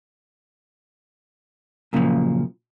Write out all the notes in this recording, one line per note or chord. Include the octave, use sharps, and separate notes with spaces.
F#2 A#2 C#3 E3 F3